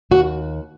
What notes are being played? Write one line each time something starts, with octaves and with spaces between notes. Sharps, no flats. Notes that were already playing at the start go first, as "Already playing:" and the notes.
D#2 F#4